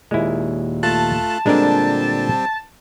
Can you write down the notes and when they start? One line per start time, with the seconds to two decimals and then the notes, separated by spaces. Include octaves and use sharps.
0.11 D#2 A#2 G#3 E4
0.83 A3 F4 A5 F#6
1.46 A#2 D3 G3 G#3 C4 D4 A#4